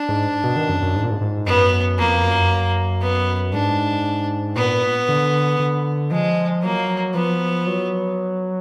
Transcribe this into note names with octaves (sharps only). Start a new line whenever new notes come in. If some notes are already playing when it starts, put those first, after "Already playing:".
Already playing: D4
G#2
B2
D#3
F#2
F#2
G#2
A#2
G#2
G#2
F#2 B3
F2 A#3
F#2
B3
G#2 D4
A#2 B3
D3
D3
F3 G#3
F#3 A#3
F3 B3
F#3